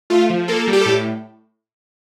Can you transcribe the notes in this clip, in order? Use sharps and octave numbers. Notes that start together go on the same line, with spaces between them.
A3 F4
F3
A#3 A4
G3
G4
A4
A2 G4